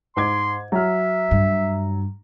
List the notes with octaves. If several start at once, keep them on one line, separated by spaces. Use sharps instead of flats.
G#2 C6 D6 G#6
F#3 E5 F6
G2